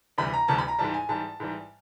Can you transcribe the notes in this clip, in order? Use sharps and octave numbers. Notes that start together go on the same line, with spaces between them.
D2 C3 E3 G3 B5
A#5
D2 C3 E3 G3 A5
B5
A#5
G#2 E3 G3 A5
G#5
G#2 E3 G3 A5
G#2 E3 G3